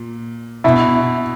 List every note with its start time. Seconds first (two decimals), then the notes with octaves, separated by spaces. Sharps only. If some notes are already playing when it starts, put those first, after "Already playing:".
Already playing: A#2
0.64 B2 E4